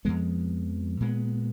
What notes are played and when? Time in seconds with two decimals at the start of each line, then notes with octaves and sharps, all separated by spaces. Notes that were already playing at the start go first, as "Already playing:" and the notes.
0.05 F2 F3 G#3 B3
1.00 A#2 G#3 B3